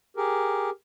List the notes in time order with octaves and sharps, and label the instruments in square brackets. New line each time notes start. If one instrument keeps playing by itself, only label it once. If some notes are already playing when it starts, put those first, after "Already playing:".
[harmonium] G4 G#4 A#4